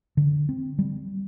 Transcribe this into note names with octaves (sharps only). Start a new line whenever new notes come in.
D3
C4
G3